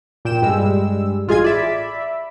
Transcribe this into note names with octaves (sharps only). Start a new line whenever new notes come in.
A#2 G5 E7
G2 G3 G#3 E6
A1 F4 G#4 D#5 G#5 G#6
D5 E5 B5